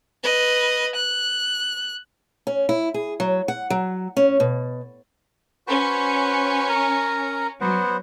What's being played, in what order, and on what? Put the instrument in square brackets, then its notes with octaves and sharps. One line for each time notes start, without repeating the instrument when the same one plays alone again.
[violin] B4 D#5
F#6
[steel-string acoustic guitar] C#4
E4
G#4
F#3
F#5
F#3
C#4
B2
[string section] C#4 [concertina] F#4 B4 C5
[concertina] A#4 A#5
[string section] F#3 [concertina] B3 C5 F#5